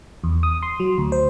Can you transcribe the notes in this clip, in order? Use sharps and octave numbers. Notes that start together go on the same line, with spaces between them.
E2
D#6
C6
F#3
D2
C5